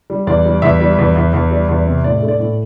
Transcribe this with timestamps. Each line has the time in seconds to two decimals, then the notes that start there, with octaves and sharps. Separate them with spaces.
0.10 G3
0.27 E2 D5
0.45 G3
0.62 E2 E5
0.80 G3
0.98 E2
1.15 E2
1.33 E2
1.51 G3
1.69 E2
1.87 C3
2.04 A2 D5
2.22 A3
2.28 D5
2.40 A2